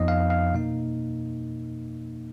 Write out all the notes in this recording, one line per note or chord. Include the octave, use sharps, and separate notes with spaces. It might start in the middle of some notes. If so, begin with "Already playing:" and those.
Already playing: F2 F3 B3 D#4 D#5
F5
F5
B2 A#3 D#4